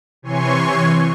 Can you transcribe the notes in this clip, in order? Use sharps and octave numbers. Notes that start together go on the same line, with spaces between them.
C3 E3 C#5 G#5 C6 C#6